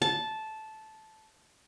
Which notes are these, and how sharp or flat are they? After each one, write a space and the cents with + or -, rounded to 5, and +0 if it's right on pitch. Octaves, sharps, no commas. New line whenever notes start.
A5 -10